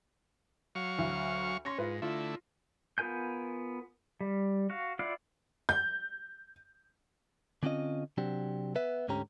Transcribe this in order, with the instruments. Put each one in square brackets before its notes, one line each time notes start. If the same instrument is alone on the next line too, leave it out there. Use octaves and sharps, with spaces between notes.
[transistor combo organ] F#3 F5 C#6
[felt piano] D2
[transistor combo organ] C#4 [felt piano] C6 A#6 C#7
[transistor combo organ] G#2 [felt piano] F4 B4
[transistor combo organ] D3 A3 E4 [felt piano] F4
[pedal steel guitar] B3 F4 A#4 G#5 G6
G3
F#4 F5
E4 F4 D5 F5 F#5
[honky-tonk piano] G6
[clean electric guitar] D3 C4 C#4 F4 D#5
C3 F#3 C4 D4 G4
B3 B4 E5
D2 G#2 D3 C#4 G4 A#5